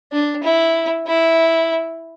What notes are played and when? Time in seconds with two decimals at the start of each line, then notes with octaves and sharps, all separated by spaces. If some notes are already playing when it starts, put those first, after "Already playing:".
0.12 D4
0.43 E4
1.07 E4